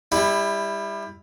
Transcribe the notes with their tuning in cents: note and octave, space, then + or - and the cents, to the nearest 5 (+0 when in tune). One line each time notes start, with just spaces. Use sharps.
G3 +30 E4 +0